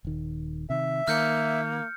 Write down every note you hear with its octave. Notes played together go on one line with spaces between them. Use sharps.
D#1 D#3
C3 D#3 E5
D#3 A#3 F6 G6 C#7